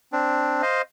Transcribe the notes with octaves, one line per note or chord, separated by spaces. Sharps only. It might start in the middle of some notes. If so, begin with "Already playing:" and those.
C4 D4
C5 D#5 F5